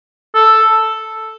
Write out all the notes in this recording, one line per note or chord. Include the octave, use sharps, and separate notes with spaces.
A4